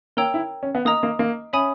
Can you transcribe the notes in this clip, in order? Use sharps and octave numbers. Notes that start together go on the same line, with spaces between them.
A#3 A#4 C#5 G5 A#5 E6
E4
C#4
B3
A#3 D#5 A#5 D#6
A#3
A#3
C#4 E5 G#5 B5 D#6